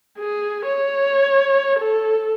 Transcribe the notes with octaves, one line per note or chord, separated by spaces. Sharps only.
G#4
C#5
A4